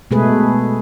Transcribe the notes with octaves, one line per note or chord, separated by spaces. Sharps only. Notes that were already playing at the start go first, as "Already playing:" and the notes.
B2 G#3 A3 G#4 B4